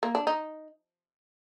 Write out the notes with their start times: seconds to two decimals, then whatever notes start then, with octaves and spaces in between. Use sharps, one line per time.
0.03 A#3
0.15 D4
0.27 D#4